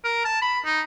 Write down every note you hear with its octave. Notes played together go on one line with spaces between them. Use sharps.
A#4
A5
B5
D#4